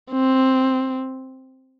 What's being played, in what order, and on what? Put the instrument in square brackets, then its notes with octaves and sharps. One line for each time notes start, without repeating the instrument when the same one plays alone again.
[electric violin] C4